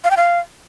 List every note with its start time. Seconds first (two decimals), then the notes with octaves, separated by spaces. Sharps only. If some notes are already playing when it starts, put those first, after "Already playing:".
0.04 F5
0.11 G5
0.17 F5